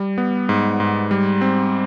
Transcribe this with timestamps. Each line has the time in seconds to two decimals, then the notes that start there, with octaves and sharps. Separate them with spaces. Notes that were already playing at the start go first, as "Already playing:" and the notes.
Already playing: G3
0.18 B3
0.49 G#2
0.80 G#2
1.11 G3
1.41 C4